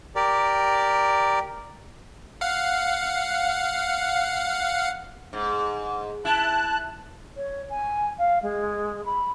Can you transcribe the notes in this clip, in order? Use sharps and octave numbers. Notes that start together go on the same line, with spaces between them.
G4 A#4 D5
F5 F#5
G#2
E4 A5 F#6
C#5
G#5
F5
G#3
B5